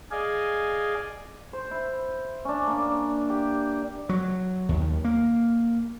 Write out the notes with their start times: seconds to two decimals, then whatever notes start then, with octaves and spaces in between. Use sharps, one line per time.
0.11 G#4 D5 D#5 F5 G#5
1.53 C5
1.71 E4
2.45 C#4 D4
2.68 A#3 D4
3.30 G4
4.09 F#3
4.69 D#2
5.05 A#3